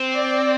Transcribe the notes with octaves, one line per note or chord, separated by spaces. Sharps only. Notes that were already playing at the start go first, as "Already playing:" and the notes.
Already playing: C4
D5